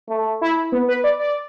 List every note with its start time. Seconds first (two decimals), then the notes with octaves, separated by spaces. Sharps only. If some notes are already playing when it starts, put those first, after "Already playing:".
0.09 A3
0.41 E4
0.72 B3
0.88 B4
1.04 D5
1.19 D5